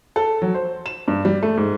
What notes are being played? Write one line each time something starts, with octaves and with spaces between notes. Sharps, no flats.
A4
F#3
C5
E7
G2
G3
A3
G#2